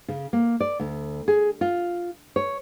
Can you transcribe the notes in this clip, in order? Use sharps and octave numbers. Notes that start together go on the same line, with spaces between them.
C#3
A#3
D5
D2
G#4
F4
C#5